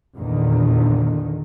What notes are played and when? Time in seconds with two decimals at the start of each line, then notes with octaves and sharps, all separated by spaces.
0.17 A#1 E2 A#2 D3 D#3